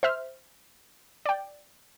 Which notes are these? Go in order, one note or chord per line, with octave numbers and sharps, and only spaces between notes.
C5 E5 F6
D5 G5